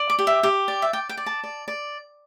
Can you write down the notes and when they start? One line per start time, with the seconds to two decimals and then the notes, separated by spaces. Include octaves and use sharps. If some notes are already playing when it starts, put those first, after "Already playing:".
Already playing: D5
0.10 D6
0.19 G4
0.27 E5
0.43 G4
0.68 D5
0.82 E5
0.93 D5 G5
1.09 G5
1.17 D5
1.26 A5
1.43 D5
1.68 D5